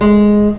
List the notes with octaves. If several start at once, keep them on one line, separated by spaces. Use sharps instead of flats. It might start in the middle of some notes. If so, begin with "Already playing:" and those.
G#3